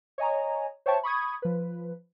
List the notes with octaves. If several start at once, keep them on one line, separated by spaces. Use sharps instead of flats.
C#5 D#5 G#5 A#5
C5 C#5 E5 G5 A5 C#6
B5 C#6 D#6 G#6
F3 B4